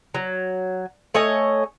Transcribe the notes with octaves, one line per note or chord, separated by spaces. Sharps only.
F#3
A3 C#5 D#5 G#5